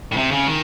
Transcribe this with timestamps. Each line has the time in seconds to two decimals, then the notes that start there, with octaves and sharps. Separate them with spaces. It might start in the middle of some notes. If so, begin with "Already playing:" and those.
0.12 A2
0.17 C3
0.31 C#3
0.47 D#3